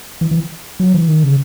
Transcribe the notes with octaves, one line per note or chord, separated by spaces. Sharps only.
E3
E3
F#3
E3
D#3
C#3